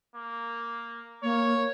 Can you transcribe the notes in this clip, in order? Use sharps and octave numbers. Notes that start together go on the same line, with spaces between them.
A#3
A#3 C#5